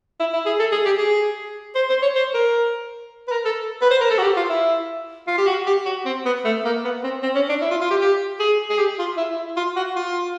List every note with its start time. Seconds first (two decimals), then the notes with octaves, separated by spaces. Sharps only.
0.20 E4
0.34 E4
0.46 G#4
0.59 A4
0.72 G#4
0.85 G4
0.98 G#4
1.76 C5
1.90 C5
2.02 C#5
2.16 C5
2.34 A#4
3.28 B4
3.32 A#4
3.45 A4
3.82 B4
3.91 C5
4.01 A#4
4.11 A4
4.18 F#4
4.23 G4
4.37 F4
4.49 E4
5.27 F4
5.38 G4
5.47 F#4
5.66 G4
5.85 F#4
6.06 C4
6.25 B3
6.45 A3
6.65 A#3
6.84 B3
7.04 C4
7.23 C4
7.35 C#4
7.49 D4
7.61 E4
7.71 F4
7.81 F4
7.91 G4
8.01 G4
8.40 G#4
8.70 G#4
8.78 G4
8.99 F4
9.17 E4
9.37 E4
9.57 F4
9.76 F#4
9.96 F4